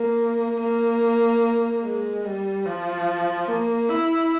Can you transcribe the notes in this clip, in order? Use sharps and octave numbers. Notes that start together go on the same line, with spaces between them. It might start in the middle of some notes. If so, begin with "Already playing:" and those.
Already playing: A#3
A#3
G#3
G3
F3
A#3
E4